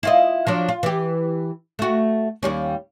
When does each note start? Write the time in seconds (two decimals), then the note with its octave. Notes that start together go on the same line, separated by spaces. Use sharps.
0.03 E4 F4 D#5
0.47 F3 F#3 D4
0.69 F4
0.83 E3 G4
1.79 A3 F#4
2.43 D#2 G3 C#4